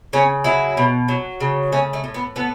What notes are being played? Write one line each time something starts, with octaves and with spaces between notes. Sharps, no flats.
C#3 C#4
F#3 E4
B2
F#3
C#3
A3 C#4
A3
A2
B3
A3 B3